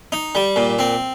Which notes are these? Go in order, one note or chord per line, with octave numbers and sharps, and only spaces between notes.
D#4
G3
A#2
C4